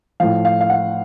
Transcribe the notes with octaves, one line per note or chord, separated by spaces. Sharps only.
A2 F3 F5
F5
F5
F#5